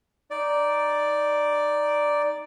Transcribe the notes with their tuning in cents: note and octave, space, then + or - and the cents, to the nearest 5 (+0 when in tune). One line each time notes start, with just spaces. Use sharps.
D#4 +0 D5 +0